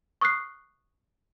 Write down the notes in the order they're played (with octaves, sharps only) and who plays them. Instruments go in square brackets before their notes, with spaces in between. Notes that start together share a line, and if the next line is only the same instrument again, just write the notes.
[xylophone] C#6 D#6 F6 F#6 C7